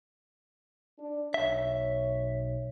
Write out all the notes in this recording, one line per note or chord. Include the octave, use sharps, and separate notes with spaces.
D4
B1 C#5 E5